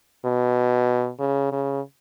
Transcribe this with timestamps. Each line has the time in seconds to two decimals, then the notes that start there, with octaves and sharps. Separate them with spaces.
0.25 B2
1.20 C#3
1.52 C#3